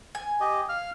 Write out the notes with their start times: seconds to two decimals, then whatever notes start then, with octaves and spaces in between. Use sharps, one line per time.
0.15 G#5
0.40 G4 D#5
0.69 F5 F6